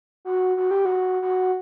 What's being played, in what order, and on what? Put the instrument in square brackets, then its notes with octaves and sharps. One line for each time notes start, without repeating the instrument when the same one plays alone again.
[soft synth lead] F#4
F#4
G4
F#4
F#4